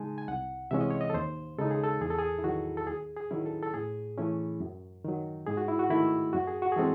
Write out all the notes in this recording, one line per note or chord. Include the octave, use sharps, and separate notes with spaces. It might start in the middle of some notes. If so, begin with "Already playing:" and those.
Already playing: C#3 G#3 D#4 G#5 A5
G#5
C2 F#5
C3 E3 G#3 C#4 E5
D#5
C#5
D#5
A4
D#2 C5
C#3 G#3 D#4 A4
G#4
A4
E2 G#4
A4
G#4
E4
D#3 F#3 F#4
A4
D#2 G#4
G#4
D#3 F#3 C#4 E4
A4
A4
A2 G#4
E3 A3 C#4 E4
F#2
D#3 F#3
G#2 G#4
F#4
E4
F#4
D#3 A3 E4
F#2 F#4
G#4
F#4
G#4
E3 G#3 C4 A4